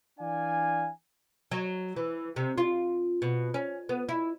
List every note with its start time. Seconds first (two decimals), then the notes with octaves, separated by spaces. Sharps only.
0.20 E3 D4 D5 F5 G#5
1.51 F#3
1.96 E3
2.36 C3
2.58 F4
3.22 B2
3.54 C#4
3.89 B3
4.09 E4